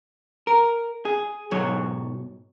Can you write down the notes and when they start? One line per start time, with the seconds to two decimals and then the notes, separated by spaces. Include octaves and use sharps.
0.47 A#4
1.05 G#4
1.51 B1 G#2 F#3 C#5